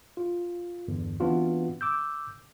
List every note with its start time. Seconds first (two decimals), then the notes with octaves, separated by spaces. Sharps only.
0.17 F4
0.88 E2 G2 D3
1.20 E3 B3 C4 D4 F4 F#4
1.81 D6 E6 G6